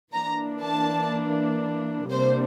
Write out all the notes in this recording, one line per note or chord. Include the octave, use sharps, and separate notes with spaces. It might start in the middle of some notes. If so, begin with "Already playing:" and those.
E3 A#3 D4 A#5
A5
C3 G3 A#3 D4 C5